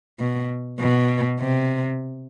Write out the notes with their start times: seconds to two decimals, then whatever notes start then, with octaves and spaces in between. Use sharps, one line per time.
0.20 B2
0.80 B2
1.40 C3